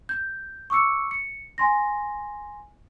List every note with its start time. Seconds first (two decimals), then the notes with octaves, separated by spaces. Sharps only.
0.09 G6
0.70 C#6 D6 E6 C#7
1.11 C#7
1.58 G#5 C6 A#6